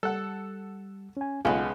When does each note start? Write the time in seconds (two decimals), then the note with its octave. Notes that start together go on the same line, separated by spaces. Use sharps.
0.03 G3 A4 F#5
1.17 C#4 G#5
1.45 B1 C#3 G#3 B3 F4